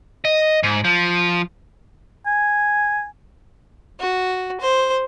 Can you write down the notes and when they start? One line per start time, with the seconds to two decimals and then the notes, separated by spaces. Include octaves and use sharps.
0.25 D#5
0.63 G#2
0.84 F3
2.26 G#5
4.00 F#4
4.60 C5